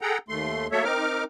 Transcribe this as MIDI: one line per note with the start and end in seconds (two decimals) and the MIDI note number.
0.01 0.18 68
0.01 0.18 69
0.01 0.18 78
0.01 0.18 79
0.01 0.18 82
0.28 0.67 39
0.28 0.67 57
0.28 0.67 84
0.72 0.84 54
0.72 0.84 57
0.72 0.84 58
0.72 0.84 69
0.72 0.84 73
0.72 0.84 76
0.84 1.24 60
0.84 1.24 63
0.84 1.24 70
0.84 1.24 86
0.84 1.24 89